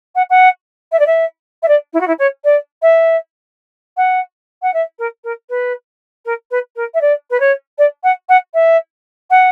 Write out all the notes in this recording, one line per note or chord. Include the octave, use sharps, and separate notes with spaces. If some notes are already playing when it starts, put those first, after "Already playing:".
F#5
F#5
E5
D5
E5
E5
D5
E4
F#4
E4
C#5
D5
E5
F#5
F#5
E5
A#4
A#4
B4
A#4
B4
A#4
E5
D5
B4
C#5
D5
F#5
F#5
E5
F#5